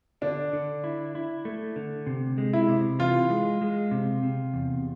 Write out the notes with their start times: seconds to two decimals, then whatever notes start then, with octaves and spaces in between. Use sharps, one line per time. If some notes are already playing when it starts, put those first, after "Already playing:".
0.22 D3 D4
0.53 D3
0.84 E4
1.15 E4
1.45 A3
1.76 D3
2.07 C3
2.38 G#3
2.53 E4
2.69 C3
2.99 E3 F4
3.30 G#3
3.61 G#3
3.91 C3
4.23 C3
4.54 E2